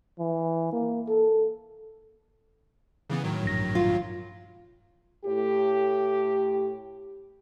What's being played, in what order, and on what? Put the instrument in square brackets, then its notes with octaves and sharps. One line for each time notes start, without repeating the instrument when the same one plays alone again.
[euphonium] E3
A#3
A4
[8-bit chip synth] C#3 E3 B3
A2 D#3 F#3
[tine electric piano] A#1 G2 A#6
[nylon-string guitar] F4
[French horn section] A2 G4